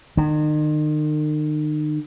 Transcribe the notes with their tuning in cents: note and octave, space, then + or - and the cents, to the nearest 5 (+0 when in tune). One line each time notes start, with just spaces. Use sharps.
D#3 -40